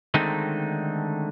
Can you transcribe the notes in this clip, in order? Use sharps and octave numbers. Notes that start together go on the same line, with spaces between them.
D3 D#3 G#3 A3 C4 D#4